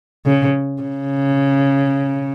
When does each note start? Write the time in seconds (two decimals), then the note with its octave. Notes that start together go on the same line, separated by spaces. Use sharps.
0.26 C#3
0.82 C#3